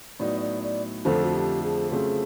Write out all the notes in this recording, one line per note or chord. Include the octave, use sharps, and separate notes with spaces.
A2 F#3 B3 D#4 D5
D5
D5
F2 D3 F3 A3 A4
F#4
G4
G#4
C#3 F#3 A3 C4 F4 G#4